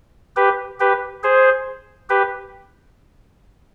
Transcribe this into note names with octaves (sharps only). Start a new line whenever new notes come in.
G4 B4
G4 B4
G#4 C5
G4 B4